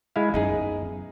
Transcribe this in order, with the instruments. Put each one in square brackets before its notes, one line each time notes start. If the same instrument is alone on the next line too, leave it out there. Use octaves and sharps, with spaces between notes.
[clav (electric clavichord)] G#3 E4 F5
[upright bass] F#2 B3 [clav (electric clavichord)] D#4 G#4